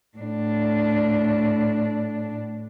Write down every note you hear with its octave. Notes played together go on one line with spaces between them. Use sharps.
A2 D4